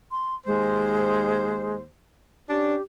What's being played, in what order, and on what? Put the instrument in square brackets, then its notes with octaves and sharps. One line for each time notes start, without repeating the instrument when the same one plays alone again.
[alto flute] C6
[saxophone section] D#2 C5 [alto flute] G#3
[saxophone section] C#4 D4 [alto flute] G4